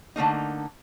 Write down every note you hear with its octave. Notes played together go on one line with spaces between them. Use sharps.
D3 A3 A#3 D#4